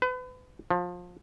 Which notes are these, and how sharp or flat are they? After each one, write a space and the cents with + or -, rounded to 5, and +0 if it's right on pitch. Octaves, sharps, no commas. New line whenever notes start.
B4 +35
F3 +25